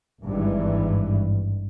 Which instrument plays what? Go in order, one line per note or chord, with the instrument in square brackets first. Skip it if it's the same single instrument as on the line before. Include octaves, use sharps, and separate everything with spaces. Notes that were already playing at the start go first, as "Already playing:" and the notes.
[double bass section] G#1 G2 E3